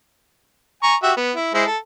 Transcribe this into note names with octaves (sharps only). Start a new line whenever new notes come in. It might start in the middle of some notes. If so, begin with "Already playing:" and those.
G#5 A#5 C#6
F#4 G4 E5
B3
E4
G#3 E4 C5
A4